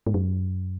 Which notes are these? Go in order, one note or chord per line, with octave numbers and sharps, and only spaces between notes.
G#2
F#2